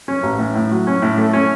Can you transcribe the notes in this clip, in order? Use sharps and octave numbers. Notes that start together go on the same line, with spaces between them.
C#4
A1
A2
A2
F#3
C#4
A2
A3
C#4